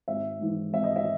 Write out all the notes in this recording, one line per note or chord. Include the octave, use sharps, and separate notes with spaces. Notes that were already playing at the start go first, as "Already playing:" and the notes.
G#1 E5
G#2 E3
G#1 E5
D#5
E5